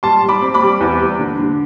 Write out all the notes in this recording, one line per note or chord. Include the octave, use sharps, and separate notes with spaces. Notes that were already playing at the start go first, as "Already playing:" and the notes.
G3 A5 C6
G3
B5 D6
C4
B5 D6
G3
E2
G3
D3
D3